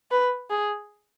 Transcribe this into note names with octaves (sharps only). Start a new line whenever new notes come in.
B4
G#4